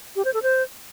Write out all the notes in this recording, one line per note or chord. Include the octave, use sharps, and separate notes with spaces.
G4
C5
A4
C5